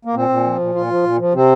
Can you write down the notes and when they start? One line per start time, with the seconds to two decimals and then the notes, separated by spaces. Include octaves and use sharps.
0.05 A#3
0.14 A#2 C4
0.29 A#2
0.45 F3
0.60 A#2
0.75 A#2 F4
0.90 F3
1.04 A#2
1.19 F3
1.34 C3 C4